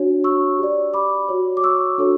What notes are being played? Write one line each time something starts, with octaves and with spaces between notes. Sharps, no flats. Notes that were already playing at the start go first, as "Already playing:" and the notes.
Already playing: D4 F#4 C#5
C#6 E6
G4 D5
B5 D6
F#4 C#5
D6
C#6 E6
D4 F#4 A4 C#5